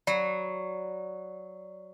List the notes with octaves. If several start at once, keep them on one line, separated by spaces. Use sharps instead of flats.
F#3 D5